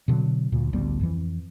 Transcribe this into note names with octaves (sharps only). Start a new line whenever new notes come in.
B2 D3 F3 F#3
D2 A#2
A1 D2 G3 B3
F2 E3